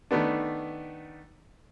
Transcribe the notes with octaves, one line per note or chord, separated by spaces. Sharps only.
D#3 A3 B3 D4